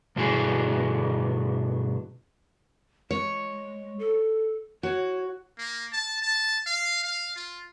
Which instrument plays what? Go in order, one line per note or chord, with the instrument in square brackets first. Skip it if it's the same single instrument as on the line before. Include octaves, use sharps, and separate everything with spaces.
[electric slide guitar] G2 B2 D4 E4 F#4 G#4
[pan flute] G#3 [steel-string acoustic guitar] C#5
[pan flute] A4
[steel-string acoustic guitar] F#4 [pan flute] C#5
[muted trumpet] A#3
A5
A5
F5
F5
F4